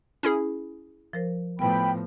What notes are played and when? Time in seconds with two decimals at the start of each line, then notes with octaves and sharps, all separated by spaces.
0.23 C#4 E4 G#4
1.13 F3 A#4 C5
1.59 A2 F3 B3 B4 G5 B5